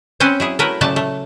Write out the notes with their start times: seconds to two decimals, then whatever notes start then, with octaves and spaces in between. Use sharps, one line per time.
0.20 C4 C#4 B4 C5 F#5 G#5
0.40 F#3 E4 G#4
0.59 F#3 A3 E4 A#4 B4
0.81 A#2 C#3 F#3 A3 D5 A5
0.96 A3